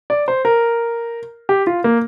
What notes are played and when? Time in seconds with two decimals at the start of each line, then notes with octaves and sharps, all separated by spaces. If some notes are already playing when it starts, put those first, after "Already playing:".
0.10 D5
0.28 C5
0.45 A#4
1.49 G4
1.67 F4
1.84 A#3